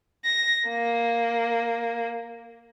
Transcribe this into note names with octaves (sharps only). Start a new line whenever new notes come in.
A#6
A#3